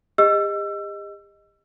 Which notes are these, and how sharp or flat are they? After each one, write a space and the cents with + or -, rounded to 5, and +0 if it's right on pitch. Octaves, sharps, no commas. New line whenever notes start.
G4 +45 D#5 +0 E6 +30